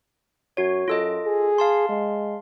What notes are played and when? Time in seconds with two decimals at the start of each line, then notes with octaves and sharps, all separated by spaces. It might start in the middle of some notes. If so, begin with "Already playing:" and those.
0.57 F#2 F#4 C#5
0.88 F#2 F4 A4 D#5
1.26 G#4
1.58 F5 A5 C6
1.89 G#3